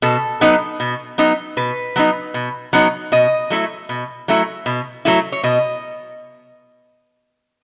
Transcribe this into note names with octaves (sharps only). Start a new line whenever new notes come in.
B2 A4
F#3 B3 D#4
B2
F#3 B3 D#4
B2 B4
F#3 B3 D#4
B2
F#3 B3 D#4
B2 D#5
F#3 A3 E4
B2
F#3 A3 E4
B2
F#3 A3 E4
C#5
B2 D#5